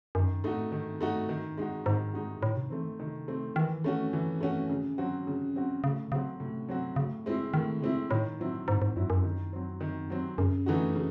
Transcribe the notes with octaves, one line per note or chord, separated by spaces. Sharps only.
F#2 D#3
G#2 A3 D#4 F#4
A2
G#2 D#3
A3 D#4 F#4
D#3
G#3 D#4 F#4
G#2 D#3
G#3 D#4 F#4
A2 D#3
C3
E3 A3 C4
D#3
C3 D#3
A3 C4
D#3 E3
A3 C#4 F#4
E3
A3 C#4 F#4
C#3
F#3 C4 F#4
C#3
F#3 C4 F#4
A2 C#3
C#3 F#3 C4 F#4
A2 C3
F#3 C4 F#4
A2 C#3
G#3 C4 E4
A2 D#3
C#3 G#3 C4 E4
A2 D#3
F#3 C4 E4
G#2 D#3
G#2
F#2 F#3 C4 E4
F#2
D#3
F#3 C4
D#3
F#3 C4
F#2 C#3
E3 A3 D#4 F#4
C#3